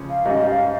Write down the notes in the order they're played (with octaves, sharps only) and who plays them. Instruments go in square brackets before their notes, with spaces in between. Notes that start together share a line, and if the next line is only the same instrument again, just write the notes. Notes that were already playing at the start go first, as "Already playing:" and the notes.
Already playing: [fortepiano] C#2 C#3 F3 C#4
[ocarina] F5
[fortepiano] G#2 G3 C#4 [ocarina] D#5
[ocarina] F5